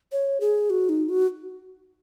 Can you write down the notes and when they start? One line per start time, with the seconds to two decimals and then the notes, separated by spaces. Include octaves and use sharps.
0.12 C#5
0.40 G#4
0.70 F#4
0.89 D#4
1.09 F#4